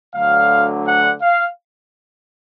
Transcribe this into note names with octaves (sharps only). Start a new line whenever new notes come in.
D2 D3 F#3 F5
F#5
F5